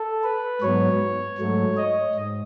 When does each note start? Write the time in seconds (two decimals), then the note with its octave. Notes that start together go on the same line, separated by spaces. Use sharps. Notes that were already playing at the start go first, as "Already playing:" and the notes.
Already playing: A4
0.24 B4
0.62 G#2 F#3 B3 C#5
1.38 G#2 F#3 A3
1.77 D#5
2.15 G#2